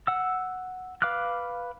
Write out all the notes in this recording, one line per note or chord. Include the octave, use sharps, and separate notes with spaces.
F#5 E6
B4 F5 D6 F6 F#6